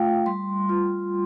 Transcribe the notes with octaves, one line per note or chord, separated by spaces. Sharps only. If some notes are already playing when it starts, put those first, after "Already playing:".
Already playing: A3 F4 F5 G5
G3 C6
F4